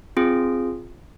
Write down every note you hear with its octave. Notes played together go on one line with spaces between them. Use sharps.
C4 F4 G#4